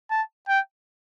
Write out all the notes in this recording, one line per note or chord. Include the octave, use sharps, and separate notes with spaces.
A5
G5